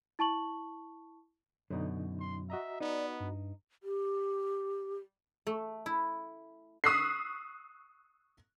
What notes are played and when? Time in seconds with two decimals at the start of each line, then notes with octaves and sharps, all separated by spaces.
0.19 E4 A5 C#6 F#7
1.70 F#2 B2 D3 D#4
2.20 C6
2.50 F#4 D#5 E5 A#5
2.81 B3 D#4 D5
3.20 G2
3.83 G4
5.47 A3
5.86 E4
6.84 C#6 D#6 E6 F#6 B6 C7